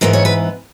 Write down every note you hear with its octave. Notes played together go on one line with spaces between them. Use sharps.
G#2 E3 B3 A#4
C#5
B4